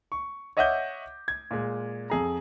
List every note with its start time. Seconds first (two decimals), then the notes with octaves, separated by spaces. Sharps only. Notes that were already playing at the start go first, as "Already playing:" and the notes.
0.12 C#6
0.57 C#5 D#5 E5 F#5 D6 G6
1.28 G#6
1.51 A#2 G#3
2.10 F2 G#4 A#5